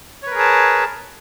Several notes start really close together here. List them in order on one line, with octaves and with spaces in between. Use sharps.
C#5 B4 A#4 G#4 A5